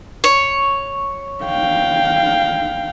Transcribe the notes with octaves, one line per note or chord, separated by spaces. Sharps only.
C#5
F5 G5